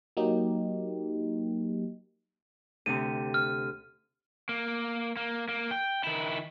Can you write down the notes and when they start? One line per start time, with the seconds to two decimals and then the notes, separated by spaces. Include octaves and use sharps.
0.17 F#3 A#3 D#4 G4
2.86 D2 C3 D#7
3.34 F6
4.49 A#3
5.17 A#3
5.49 A#3
5.71 G5
6.04 D#3 E4